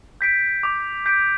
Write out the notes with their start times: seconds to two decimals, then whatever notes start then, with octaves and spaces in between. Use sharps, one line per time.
0.21 G6 B6 D7
0.63 D6
1.06 G6 B6 D7